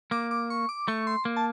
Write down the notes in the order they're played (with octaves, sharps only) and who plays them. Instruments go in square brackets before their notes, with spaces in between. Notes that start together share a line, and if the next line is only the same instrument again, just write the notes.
[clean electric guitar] A#3 [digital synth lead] D6
[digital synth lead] D6
C#6
D6
[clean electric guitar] A3 [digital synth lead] C#6
[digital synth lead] C6
[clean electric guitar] A#3
[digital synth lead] A5